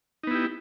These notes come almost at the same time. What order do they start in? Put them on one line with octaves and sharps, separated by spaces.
D#4 B3 E4 G4